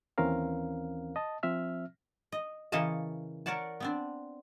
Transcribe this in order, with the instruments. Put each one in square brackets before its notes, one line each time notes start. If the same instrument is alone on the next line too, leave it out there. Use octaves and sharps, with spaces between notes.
[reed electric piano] D#2 E3 C4 C#4 A#4 F5
D#5 A5
F3 C4 E5 F6
[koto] D#5
C#3 E3 A#3 C#5 D#5 A5
A#4 C#5 D5 F#5 A5
B3 C4 D4